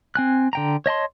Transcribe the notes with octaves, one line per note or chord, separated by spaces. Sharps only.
C4 G#5 F#6
D3 G5 A#5
C#5 D#5 A5 C6